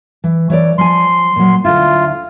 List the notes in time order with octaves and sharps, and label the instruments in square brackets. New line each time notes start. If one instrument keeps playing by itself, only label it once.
[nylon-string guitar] E3
E3 C#5 D5
[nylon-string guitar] F3 G#5 [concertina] C6
[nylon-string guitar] A#2 F#3
[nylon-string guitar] D2 D3 E4 [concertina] F4